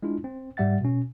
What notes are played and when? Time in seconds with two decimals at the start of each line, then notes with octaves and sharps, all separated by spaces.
0.03 G#3 D4 E4 F4
0.24 C4
0.57 G#2 G3 E5 F#5 A6
0.81 B2 C#4